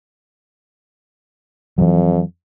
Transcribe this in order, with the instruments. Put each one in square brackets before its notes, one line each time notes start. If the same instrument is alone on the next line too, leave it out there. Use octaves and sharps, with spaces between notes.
[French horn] F2 [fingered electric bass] E3 F#3